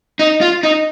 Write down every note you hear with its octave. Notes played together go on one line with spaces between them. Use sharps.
D#4
F4
D#4